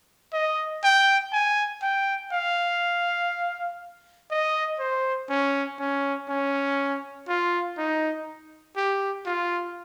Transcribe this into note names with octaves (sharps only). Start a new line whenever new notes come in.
D#5
G5
G#5
G5
F5
D#5
C5
C#4
C#4
C#4
F4
D#4
G4
F4